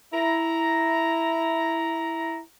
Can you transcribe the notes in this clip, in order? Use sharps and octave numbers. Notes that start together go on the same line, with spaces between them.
E4 A#5